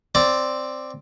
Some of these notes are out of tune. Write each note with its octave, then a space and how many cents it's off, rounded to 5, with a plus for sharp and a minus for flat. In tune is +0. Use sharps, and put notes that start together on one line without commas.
C4 +0 D5 +0